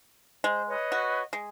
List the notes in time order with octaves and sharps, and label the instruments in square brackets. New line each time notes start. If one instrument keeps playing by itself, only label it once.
[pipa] G#3 [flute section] C5
[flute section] B4 C#5 D#5
[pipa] F#4
G#3